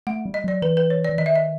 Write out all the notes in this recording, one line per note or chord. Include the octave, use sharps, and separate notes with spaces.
A3 F#5
G3
D#5
F#3 D5
E3 B4
B4
C#5
E3 D5
D#3 D#5
E5
D#5